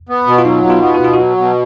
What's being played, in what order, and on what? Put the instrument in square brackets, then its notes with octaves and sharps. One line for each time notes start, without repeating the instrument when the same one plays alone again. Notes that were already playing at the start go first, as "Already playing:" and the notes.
[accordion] B3
B2
[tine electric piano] F4
[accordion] F#3 [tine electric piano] D#4
[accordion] B2
[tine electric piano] F4
[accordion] B3
[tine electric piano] F#4
[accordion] B2 [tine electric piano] F4
[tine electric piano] F#4
[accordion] F#3
B2